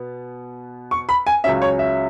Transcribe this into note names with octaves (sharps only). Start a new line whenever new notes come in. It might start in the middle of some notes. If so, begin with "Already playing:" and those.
Already playing: B2 B3
C#6
B5
G#5
C#2 C#3 F#3 C#4 E5
C#5
E5